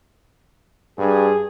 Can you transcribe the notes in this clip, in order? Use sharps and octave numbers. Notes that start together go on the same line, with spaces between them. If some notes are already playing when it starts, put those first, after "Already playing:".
G2 G#4